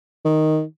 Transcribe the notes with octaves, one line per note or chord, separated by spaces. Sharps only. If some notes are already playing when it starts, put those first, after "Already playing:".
D#3